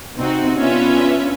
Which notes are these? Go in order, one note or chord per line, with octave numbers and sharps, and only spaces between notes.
C3 C4 D#4 F#4
B3 C#4 D4 F4 B4 E5